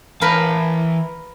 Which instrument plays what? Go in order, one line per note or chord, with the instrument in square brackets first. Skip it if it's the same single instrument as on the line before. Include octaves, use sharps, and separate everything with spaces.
[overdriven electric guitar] E3 A5 [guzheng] A#4 B4 F5